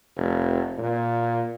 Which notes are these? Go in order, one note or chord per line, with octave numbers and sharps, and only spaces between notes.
F1
A#2